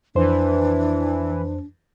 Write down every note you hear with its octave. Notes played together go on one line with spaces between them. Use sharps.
F2 E3 D4 C5